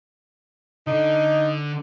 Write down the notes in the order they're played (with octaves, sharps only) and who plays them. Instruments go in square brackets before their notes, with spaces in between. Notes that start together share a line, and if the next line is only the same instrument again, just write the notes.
[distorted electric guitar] D3 [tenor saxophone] D#4